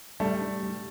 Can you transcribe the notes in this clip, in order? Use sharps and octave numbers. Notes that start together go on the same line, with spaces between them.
G3 A3
G3
G3